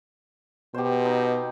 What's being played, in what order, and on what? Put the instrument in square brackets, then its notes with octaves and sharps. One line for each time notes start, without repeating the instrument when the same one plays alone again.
[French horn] B2 [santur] G4 C5
[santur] D#4